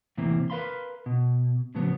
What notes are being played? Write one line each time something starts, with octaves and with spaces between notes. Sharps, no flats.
E2 A2 C3 E3 A#3 C4
A#4 B4 D#5 F5 B5 C6
B2
A2 C#3 F3 F#3 B3